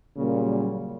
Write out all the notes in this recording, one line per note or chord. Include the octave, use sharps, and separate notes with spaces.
A#2 C#3 F#3 G3 A#3